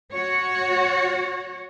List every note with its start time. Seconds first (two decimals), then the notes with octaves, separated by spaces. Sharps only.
0.12 F#4 C#5